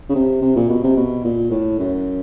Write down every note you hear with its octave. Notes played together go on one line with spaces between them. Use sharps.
C#3
C3
C3
A#2
B2
C3
B2
A#2
A2
F#2